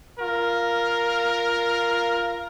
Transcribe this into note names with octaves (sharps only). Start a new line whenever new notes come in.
F4 A#4